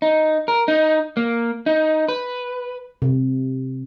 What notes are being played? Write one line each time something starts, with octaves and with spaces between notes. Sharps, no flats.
D#4
A#4
D#4
A#3
D#4
B4
C3